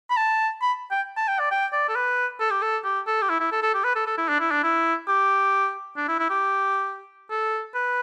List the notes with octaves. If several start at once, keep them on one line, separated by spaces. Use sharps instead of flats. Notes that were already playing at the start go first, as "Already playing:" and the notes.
B5
A5
B5
G5
A5
G5
D5
G5
D5
A4
B4
A4
G4
A4
G4
A4
G4
E4
E4
A4
A4
G4
B4
A4
A4
E4
D4
E4
D4
E4
G4
D4
E4
E4
G4
A4
B4